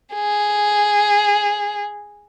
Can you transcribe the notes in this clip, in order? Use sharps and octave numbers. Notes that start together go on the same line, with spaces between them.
G#4